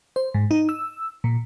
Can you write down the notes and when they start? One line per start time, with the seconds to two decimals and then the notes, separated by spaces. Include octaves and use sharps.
0.16 C5
0.34 G#2
0.51 D#4
0.69 E6
1.24 A#2